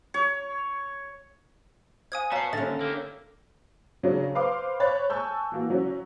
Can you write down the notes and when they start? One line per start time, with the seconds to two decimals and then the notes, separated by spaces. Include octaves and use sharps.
0.14 C#5
2.12 C5 F5 G#5 D#6 G#6
2.32 B3 F#4 C#5 F5 A5 A#5 C7
2.53 D#2 D3 C#4 E5 A6
2.81 A#3 G4 A4
4.03 C#3 F#3 D4 C#5
4.35 B4 C5 F5 C6 D6
4.80 C5 C#5 B5 F#6 A6
5.10 G#5 A5 C#6 E6 G6
5.52 E3 A#3 F#4
5.70 F#3 C#4 F#4